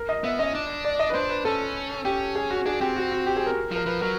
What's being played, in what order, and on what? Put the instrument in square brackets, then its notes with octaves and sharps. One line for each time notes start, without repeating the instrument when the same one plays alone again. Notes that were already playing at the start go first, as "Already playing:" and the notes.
Already playing: [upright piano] A#4
D#5
[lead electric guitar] B3 [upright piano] E5
[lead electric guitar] C#4 [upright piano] D#5
[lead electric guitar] D4
[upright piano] D5
D#5
B4
[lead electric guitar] D4 [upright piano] C5
[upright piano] B4
[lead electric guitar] C#4 [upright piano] A4
[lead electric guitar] C#4 [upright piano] G4
[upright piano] G#4
F#4
[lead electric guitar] D4 [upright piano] G#4
[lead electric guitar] C4 [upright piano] G4
[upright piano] F#4
F#4
G4
G#4
A#4
[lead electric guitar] F3 [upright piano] A#4
[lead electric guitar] F3 [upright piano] B4
[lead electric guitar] F#3 [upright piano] A#4